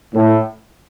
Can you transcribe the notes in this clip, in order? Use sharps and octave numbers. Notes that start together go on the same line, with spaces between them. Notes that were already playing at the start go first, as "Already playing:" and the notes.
A2